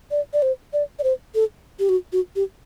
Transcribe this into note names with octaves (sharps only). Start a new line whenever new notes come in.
D5
D5
C5
D5
D5
C5
A4
G4
F#4
F#4
G4